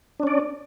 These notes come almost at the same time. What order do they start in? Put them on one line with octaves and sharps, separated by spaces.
D4 C#4 D5